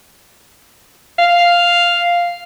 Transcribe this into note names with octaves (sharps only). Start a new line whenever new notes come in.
F5